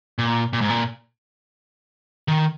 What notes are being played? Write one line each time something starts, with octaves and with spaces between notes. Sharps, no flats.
A#2
A#2
G#2
A#2
D#3